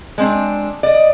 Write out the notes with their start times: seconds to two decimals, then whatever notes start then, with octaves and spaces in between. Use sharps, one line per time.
0.18 G#3 C4 D4
0.83 D5 D#5